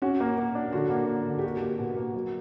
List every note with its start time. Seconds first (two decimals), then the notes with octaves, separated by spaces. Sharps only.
0.02 C#4 F#4
0.20 A#3
0.38 A#3
0.55 D4
0.72 D3 F#4
0.90 A#3
1.08 A#3
1.26 D3
1.39 G4
1.43 A#3 F#4
1.62 A#3
1.79 B2
1.96 A#3
2.14 F#3